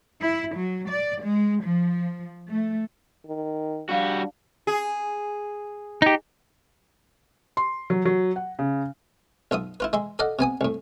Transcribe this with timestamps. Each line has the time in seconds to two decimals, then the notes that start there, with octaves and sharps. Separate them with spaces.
0.20 E4
0.56 F#3
0.89 D5
1.24 G#3
1.63 F3
2.48 A3
3.27 D#3
3.89 G3 D4 F#4 G4 F5
4.67 G#4
6.02 D#4 G4
7.57 C6
7.90 F#3
8.05 F#3
8.36 F#5
8.59 C#3
9.51 B1 F4 E5 D#6
9.80 E4 F4 B4
9.93 G#3 E5 C6
10.19 A4 D5 D#5 F5 F#5
10.39 C3 B3 G#5 D#6
10.61 C2 A2